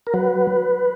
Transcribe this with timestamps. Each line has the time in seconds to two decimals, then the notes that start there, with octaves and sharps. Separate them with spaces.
0.07 A#4
0.14 F#3 B4